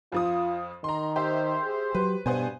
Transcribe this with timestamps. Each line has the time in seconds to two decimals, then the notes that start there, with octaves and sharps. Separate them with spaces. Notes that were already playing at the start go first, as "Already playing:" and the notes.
0.12 F2 F3 F4 D#6
0.84 D#3 A#5 C6
1.16 G4 C5 E5
1.64 G#4
1.95 F#3 G4 B4
2.26 G2 B2 B3 C5 G#5